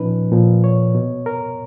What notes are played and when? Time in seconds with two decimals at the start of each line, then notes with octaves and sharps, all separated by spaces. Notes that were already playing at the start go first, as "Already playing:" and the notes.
Already playing: A#2 F3 C#4 D#4 B4
0.32 A#2 F3
0.64 C#5
0.95 B2
1.26 A#4